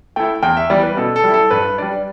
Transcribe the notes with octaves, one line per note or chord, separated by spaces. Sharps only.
A3 E4 G5
E2 G5
E5
E3 G3 B3 D5
B4
B2 A4
A4
G3 E4
A4
G2 B4
G3 D4 D5